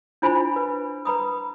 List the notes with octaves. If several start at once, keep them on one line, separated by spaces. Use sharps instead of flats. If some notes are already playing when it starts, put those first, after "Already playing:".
D4 E4 F4 C5 G#5 B5
B4
B4 A#5 B5 D#6